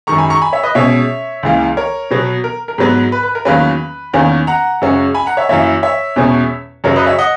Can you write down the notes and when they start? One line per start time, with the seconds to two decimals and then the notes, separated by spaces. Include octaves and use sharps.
0.07 F#2 D#3 G#3 A#5 C#6
0.18 G#5 B5
0.30 A#5 C#6
0.41 G#5 B5
0.53 C#5 E5
0.63 B4 D#5
0.75 B2 G#3 C#4 C#5 E5
1.43 C#2 C#3 E3 A#3
1.77 A#4 C#5
2.11 B2 F#3 B3
2.44 A#4
2.68 A#4
2.78 G#2 F#3 B3
3.12 B4
3.23 B4
3.35 A#4
3.45 E2 D#3 F#3 A#3 C#4 B4
4.13 E2 D#3 A#3 C#4
4.47 F#5 A#5
4.82 F#2 C#3 G#3 C#4
5.14 G#5 B5
5.26 F#5 A#5
5.37 C#5 E5
5.49 F#2 E3 A#3 C#5 E5
5.83 C#5 E5
6.16 E2 B2 G#3 C#4
6.84 F#2 C#3 F#3 A#4 C#5
6.96 B4 D#5
7.06 C#5 E5
7.19 D#5 F#5